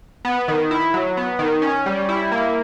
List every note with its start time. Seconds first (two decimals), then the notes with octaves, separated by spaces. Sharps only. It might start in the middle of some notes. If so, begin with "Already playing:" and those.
0.25 B3
0.48 D#3
0.71 E4
0.94 F#3
1.17 B3
1.39 D#3
1.62 C#4
1.86 G3
2.09 E4
2.32 A#3